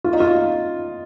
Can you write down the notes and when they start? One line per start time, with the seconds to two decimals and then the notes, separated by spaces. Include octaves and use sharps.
0.04 F4
0.13 D#4
0.20 F4